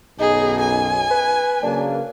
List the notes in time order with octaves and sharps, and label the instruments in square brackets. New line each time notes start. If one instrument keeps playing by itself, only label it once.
[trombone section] B1 F#2 [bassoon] D#4 [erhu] G#4
[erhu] G#5
[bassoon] B4
[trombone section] C#3 F#3 A#3 [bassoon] D4